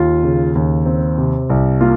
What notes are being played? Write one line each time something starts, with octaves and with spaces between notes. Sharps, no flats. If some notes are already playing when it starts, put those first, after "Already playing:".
Already playing: D#2 F4
C#3
D#2
C4
C3
C2
A#3 F4